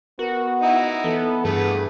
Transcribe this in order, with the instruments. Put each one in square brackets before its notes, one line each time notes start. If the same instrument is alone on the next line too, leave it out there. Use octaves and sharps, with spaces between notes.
[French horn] B3 [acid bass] F#4 [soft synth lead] A#4
[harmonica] D#4 E4 [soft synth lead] F#5
[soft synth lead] E3 [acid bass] B3 [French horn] A4
[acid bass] G2 [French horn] E3 [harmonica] A3 B3 B4 [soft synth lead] G#4